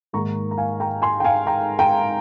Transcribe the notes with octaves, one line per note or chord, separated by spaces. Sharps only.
G#2 D#3 A#3 A#5 C#6
A#5
F5 G#5
G5 A#5
G#5 C6
G5
F5 G#5
G5 A#5
G5 A#5